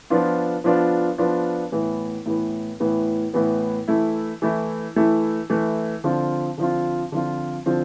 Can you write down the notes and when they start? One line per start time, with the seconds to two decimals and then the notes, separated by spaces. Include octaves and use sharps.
0.10 F3 B3 D4 F4
0.64 F3 B3 D4 F4
1.18 F3 B3 D4 F4
1.72 A2 E3 B3
2.26 A2 E3 B3
2.80 A2 E3 B3
3.34 A2 E3 B3
3.88 E3 A3 E4
4.42 E3 A3 E4
4.96 E3 A3 E4
5.50 E3 A3 E4
6.04 D3 F3 C4 F4
6.58 D3 F3 C4 F4
7.12 D3 F3 C4 F4
7.66 D3 F3 C4 F4